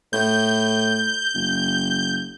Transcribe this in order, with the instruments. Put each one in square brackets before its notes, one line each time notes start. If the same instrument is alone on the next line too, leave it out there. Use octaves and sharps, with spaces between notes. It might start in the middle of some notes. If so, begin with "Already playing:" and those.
[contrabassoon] A2 [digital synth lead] G6
[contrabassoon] F#1